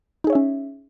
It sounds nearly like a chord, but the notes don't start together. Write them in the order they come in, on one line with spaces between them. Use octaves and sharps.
D#4 G#4 C#5 E5 C#4